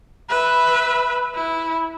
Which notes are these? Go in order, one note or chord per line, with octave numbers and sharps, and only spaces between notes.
B4 E5
E4